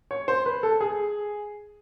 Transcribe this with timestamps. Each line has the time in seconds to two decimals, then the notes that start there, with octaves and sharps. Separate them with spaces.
0.11 C#5
0.28 C5
0.46 B4
0.63 A4
0.81 G#4